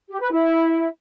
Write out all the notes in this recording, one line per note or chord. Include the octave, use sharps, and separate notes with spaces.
G4
B4
E4